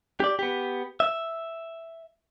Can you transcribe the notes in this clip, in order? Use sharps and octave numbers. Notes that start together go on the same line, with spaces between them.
G4 D5
B3 G4
E5